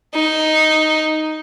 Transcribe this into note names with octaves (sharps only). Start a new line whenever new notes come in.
D#4